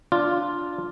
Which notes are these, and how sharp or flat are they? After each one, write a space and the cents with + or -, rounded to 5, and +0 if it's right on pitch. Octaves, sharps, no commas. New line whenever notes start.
D4 +0 F4 +0